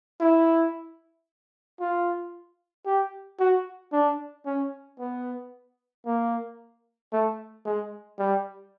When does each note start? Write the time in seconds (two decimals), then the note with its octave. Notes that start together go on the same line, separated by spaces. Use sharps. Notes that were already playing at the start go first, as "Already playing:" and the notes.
0.20 E4
1.80 F4
2.86 G4
3.40 F#4
3.92 D4
4.46 C#4
5.00 B3
6.06 A#3
7.13 A3
7.65 G#3
8.19 G3